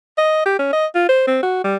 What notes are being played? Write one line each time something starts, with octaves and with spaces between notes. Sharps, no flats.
D#5
G4
C#4
D#5
F4
C5
C4
F#4
G3